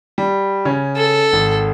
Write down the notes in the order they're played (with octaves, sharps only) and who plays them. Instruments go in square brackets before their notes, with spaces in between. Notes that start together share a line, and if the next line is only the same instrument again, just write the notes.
[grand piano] G3
C#3 C#4
[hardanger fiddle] A4
[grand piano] G#1